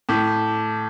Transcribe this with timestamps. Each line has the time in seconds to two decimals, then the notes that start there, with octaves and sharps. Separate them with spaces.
0.09 A2 A5 D6 G6 B6